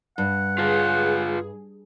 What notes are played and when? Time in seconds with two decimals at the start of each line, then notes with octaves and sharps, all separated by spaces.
0.18 G2 F#5
0.58 F4 G#4 B4 F5